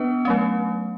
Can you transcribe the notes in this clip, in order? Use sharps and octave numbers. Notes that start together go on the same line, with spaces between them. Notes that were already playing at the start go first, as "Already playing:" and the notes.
Already playing: B3 D4 B4
F#3 A3 C#4